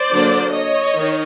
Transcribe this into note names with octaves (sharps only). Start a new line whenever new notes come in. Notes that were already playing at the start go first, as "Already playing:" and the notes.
Already playing: C5 D5
D3 F#3 A#3 D4
C#5 D#5
D#3